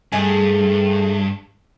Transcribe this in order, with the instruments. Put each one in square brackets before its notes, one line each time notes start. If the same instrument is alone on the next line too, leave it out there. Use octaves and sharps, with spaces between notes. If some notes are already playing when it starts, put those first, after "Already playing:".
[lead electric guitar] G2 [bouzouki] A3 G#4